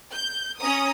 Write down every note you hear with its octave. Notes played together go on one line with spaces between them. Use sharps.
G6
C#4 A#5 D#6